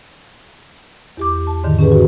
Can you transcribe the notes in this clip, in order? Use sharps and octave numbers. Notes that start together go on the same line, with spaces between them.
E2 G4 D6
G4
A5
E2 G#2 D3 D#3
C#4 G4 G#4 B4
F#4